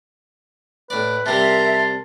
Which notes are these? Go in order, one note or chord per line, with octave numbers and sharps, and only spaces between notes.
A2 B4 D5
C3 G3 A#4 E5 A5 C6